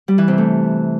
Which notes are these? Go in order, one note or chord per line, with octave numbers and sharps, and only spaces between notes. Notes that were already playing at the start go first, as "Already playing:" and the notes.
G3
E3
C3
A3